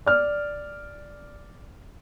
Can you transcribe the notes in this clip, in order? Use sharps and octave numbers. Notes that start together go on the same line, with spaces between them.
D5 F6